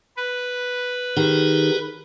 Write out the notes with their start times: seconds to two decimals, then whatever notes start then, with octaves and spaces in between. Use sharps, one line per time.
0.17 B4
1.17 D#3 G4 G#4 A#4